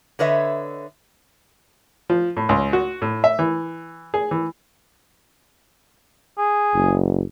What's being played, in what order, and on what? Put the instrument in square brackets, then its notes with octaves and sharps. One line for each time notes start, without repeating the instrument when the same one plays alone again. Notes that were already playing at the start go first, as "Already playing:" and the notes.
[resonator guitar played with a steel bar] D3 B4 C#5 D#5 E5
[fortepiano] F3
A2
C#2
F#4
A2
E5
E3
G#4
E3
[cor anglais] G#4
[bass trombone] F#1